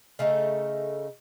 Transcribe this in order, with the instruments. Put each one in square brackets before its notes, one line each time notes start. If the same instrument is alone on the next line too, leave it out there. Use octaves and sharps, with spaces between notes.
[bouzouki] C#3 A3 D#4